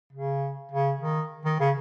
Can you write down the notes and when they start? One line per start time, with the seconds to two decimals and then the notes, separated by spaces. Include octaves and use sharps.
0.13 C#3
0.72 C#3
1.01 D#3
1.45 D#3
1.60 C#3